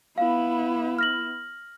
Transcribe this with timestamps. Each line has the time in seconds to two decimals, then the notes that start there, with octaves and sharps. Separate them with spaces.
0.18 B3 E4 F5
0.99 F6 A#6 F#7